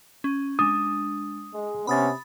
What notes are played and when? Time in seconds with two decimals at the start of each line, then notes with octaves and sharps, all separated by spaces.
0.24 C#4
0.59 G#3 D4 D#6
1.52 G#3
1.87 C3 B3 C#4 B5 D#6 A6